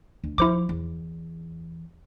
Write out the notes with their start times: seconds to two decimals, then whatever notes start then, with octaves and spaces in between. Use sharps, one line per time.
0.24 D2
0.38 F3 E4 C5 D6
0.69 E2